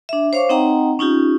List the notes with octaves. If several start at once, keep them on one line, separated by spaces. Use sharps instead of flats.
D4 E5
C5 C#5 F5 C#6 D6
C4 D#4 D#5 F#5 G5 A#5
C#4 D#4 F4 G4